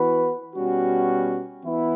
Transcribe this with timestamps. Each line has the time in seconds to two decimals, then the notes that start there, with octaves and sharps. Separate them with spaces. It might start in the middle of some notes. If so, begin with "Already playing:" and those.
Already playing: E3 B3 F#4 B4
0.55 B2 G3 C#4 F#4
1.65 E3 B3 E4